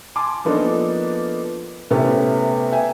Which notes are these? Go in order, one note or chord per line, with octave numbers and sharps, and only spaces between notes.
G#5 A5 C6 D6
F3 A#3 B3 D4 D#4 A4
C3 A3 B3 C#4 E4 G4
E5 G5 G#5